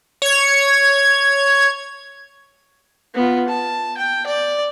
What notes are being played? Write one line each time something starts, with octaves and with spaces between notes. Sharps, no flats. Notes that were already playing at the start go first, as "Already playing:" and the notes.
C#5 G#6
B3 F4
A5
G5
D5